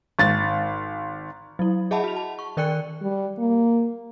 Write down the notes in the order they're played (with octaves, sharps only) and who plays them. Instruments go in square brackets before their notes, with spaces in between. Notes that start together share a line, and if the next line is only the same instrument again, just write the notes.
[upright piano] G#1 A6
[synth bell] F#3 E4
G#4 D#5 E5 F#5 A5 B5
F#4 F7
A5
C#6
D#3 A#4 D5 G5 F#6 C#7
[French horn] G3
A#3